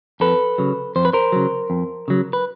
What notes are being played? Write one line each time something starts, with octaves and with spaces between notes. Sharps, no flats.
F2 A4 B4
C#3 F#3
F2 C5
B4
A#4 C5
C#3 F#3
F2
C#3 F#3
B4